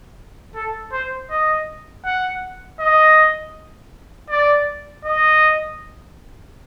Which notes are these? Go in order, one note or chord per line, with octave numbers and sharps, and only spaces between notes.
A4
C5
D#5
F#5
D#5
D5
D#5